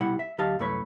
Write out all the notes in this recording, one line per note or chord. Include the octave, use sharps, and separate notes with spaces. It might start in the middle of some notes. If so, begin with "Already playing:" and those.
C2 B2 G3 E4 F#5
E5
D2 F#3 G4 D#5 F5 A5
C2 F#2 A3 B4 C#5